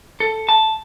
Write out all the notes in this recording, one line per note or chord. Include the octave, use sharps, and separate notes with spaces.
A4
A5